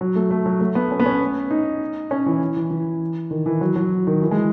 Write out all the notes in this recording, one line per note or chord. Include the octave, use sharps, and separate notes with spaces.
F#3
A3
A3
F#3
A3
B3
C#4
B3
C#4
D#4
C#4
E3
E3
E3
D#3
E3
F#3
F#3
D#3
E3
G#3